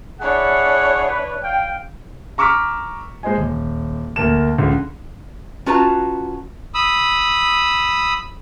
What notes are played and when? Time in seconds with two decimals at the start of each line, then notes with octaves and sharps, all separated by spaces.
0.20 D4 E4 G#4 C#5 F#5
1.07 B4
1.42 F5 G5
2.38 A#5 C#6 D6 E6 F6 B6
3.23 G#3 C5 D#5 G#5
3.38 D#1
4.16 D2 A#3 A5 E7
4.58 C#2 D3
5.66 C#4 F4 F#4 B4 A5 A#5
6.75 B5 D#6 E6